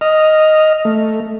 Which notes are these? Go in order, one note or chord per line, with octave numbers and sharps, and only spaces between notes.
D#5 F6
A3